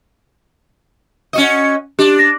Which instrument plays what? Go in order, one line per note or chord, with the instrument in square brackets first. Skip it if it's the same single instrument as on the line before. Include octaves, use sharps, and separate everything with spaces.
[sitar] C#4 F#4 D#5
[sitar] D4 [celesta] G4
[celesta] A#6